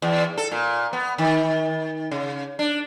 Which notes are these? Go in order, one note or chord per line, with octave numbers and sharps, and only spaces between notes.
E2
A4
A#2
B3
D#3
C#3
D4